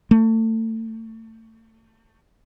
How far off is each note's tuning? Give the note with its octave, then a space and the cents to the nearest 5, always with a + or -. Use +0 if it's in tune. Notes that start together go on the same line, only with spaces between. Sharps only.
A3 +30